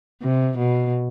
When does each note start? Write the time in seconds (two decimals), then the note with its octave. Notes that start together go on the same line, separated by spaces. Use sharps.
0.21 C3
0.58 B2